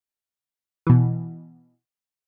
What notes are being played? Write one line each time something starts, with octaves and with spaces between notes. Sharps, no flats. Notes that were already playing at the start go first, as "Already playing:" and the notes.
B2 E3